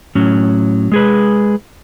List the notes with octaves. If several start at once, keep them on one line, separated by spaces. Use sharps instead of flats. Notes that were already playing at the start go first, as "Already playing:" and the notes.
A2 F#3 C#4
G#3 G#4 B4